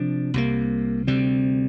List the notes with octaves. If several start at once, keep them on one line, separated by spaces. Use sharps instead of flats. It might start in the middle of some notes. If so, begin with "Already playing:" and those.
Already playing: C3 F3 D4
C2 C3 A#3
D2 C3 G3 C4